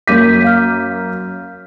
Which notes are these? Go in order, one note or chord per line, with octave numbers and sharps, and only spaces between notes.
F#2 A#3 D6 G6 B6 D#7
F5 F6 G6